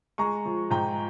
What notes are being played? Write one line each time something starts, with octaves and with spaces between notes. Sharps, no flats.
G#3 A#5 C#6
F3
G#2 G5 A#5